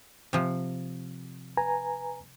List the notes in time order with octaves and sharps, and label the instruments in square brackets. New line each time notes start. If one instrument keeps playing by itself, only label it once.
[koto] C3 F3
[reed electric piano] B4 G#5 A#5